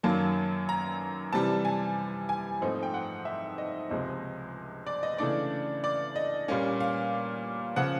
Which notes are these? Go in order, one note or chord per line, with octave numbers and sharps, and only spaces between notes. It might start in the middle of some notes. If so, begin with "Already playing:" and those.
F#2 D#3 F#3 A#3 A5
A#5
C3 E3 G3 A5
G#5
G#5
G#2 F3 A3 C4 D#4
G5
F#5
E5
D#5
C#2 C3 F3 G#3 D#5
D5
D#5
C#3 E3 A3 D4 D5
D5
D#5
A#2 G3 A#3 C#4
F5
C#3 F3 F#5